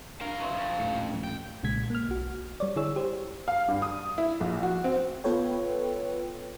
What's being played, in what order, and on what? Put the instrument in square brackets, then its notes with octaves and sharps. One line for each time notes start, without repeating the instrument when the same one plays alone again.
[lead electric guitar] D4 F5 [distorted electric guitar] A#4
[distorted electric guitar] E3 F#3 [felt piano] E5 C6 C#6
[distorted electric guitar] F2
[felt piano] D#1 A2 C#7
[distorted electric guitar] G5
[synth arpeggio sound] B1 A#2 C#3 G#3 G#6 B6
A#3 F6
B1 F#4
G3 C#5 D5
D3 E4 G#4 C#5 E6
G4 C5
[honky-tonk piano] F5
G2
D#6
E4
A#1
F#4
C4
[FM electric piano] B3 F4 A4 B4 C#5 G5